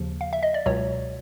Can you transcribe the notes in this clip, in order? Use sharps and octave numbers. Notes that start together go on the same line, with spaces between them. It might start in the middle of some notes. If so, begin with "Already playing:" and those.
Already playing: D#2 C#3 F3
F5
E5
D#5
D5
C#2 B2 F#3 C#5